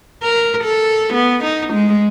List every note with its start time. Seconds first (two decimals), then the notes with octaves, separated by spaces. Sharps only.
0.23 A#4
0.64 A4
1.14 B3
1.44 D#4
1.73 G#3